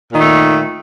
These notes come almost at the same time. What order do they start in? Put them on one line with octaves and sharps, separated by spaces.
A#2 D#3 A3